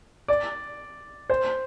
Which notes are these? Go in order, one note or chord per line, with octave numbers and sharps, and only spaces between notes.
D5
C5